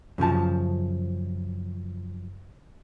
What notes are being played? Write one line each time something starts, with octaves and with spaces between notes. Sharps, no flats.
F#2 C#3 F3 A5